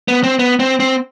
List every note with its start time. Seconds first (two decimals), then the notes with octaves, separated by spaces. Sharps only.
0.08 B3
0.23 C4
0.39 B3
0.60 C4
0.80 C4